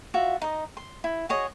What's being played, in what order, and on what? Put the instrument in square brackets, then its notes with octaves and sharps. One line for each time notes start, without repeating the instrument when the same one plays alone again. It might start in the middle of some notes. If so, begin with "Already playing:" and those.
[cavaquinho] F4 F#4 E5
D#4 D#5
C6
E4
F#4 G#4 C#5 D#5